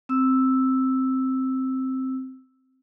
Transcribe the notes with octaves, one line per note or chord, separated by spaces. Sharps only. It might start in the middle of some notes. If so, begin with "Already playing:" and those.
C4 E6